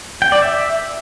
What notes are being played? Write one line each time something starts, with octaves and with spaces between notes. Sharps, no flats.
G5
D5
E5